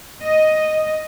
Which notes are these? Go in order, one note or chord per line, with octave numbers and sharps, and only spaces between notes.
D#5